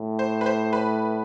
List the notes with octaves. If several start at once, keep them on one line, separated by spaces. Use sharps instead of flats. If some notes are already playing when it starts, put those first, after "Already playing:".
Already playing: A2
C5
B4
C5
B4